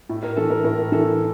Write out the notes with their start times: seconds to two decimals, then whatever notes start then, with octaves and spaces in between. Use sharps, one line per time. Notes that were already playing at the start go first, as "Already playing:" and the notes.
0.09 A2
0.23 A#4
0.36 E3 A4
0.50 A#4
0.64 A2 A#4
0.92 E3 A4